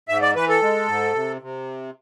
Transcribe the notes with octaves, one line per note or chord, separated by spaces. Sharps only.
G#2 E5
D5
E3 B4
A4
G#3
G#2
C3
C3